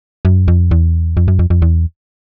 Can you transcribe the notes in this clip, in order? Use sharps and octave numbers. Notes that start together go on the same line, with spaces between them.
F#2
F2
E2
F2
F#2
F2
F2
E2